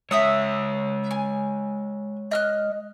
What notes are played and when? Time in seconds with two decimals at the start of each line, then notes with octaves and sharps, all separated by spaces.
0.11 G#3 C#5 E5 D#6 E6
1.11 G#5
2.31 D#5 F6 F#6